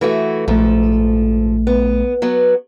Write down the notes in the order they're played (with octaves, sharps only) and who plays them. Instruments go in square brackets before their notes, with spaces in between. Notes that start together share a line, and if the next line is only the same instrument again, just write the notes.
[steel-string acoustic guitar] E3 A3 F#4
[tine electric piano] A#1 A3 [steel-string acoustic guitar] G#2 F3 A4
[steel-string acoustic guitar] B3
F#3 B3